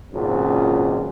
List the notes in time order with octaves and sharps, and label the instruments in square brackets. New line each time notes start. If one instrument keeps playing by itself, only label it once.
[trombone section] G#1 C#2 F#2 A#2